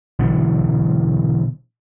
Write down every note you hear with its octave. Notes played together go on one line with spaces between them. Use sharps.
B2 D3 E3 F#3